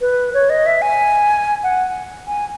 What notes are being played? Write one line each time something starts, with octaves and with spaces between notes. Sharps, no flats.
B4
C#5
D#5
E5
G#5
F#5
G#5